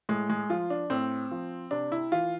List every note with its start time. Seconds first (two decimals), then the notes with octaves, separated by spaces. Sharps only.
0.09 A2 G#3
0.30 G#3
0.50 F3 F4
0.70 D4
0.90 A2 C4
1.31 F3
1.71 C3 D4
1.92 E4
2.12 E3 F4